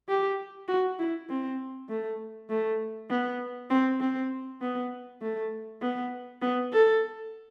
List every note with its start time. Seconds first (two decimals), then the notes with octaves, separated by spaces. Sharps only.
0.09 G4
0.68 F#4
0.99 E4
1.29 C4
1.89 A3
2.50 A3
3.10 B3
3.70 C4
4.01 C4
4.61 B3
5.22 A3
5.82 B3
6.42 B3
6.73 A4